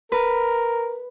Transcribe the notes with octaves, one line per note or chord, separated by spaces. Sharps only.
A#4 B4